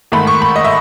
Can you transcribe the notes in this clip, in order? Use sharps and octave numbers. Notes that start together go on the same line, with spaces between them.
G#2 D#3 A3 B5
C#6
B5
D#5
E5